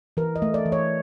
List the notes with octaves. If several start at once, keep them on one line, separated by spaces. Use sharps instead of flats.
E3 A#4
D#5
A3
D5
E3
C#5